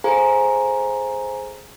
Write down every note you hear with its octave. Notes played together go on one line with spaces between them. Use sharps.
G#4 A4 C5 F5 G#5 A#5